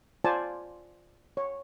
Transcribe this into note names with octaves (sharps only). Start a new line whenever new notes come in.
F4 C5 D5 G#5 A5
C#5